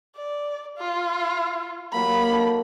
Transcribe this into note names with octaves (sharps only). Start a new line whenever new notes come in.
D5
F4
F#3 A#3 G4 B5
D#4 F#4 A4